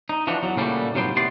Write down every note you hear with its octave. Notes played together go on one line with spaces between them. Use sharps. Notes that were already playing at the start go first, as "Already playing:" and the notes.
D#4
E3 F3 D4 F#4
E2 F#3
A#2 C#3 G3 A3 F#4
C2 G#2 F#3 B3 C5 G5
D#2 C3 B3 D5 C6